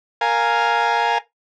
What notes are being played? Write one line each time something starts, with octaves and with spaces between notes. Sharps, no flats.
A#4 F5 G#5